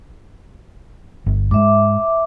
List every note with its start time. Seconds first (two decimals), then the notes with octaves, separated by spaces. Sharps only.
1.26 G1
1.51 G#2 G#3 E5 D6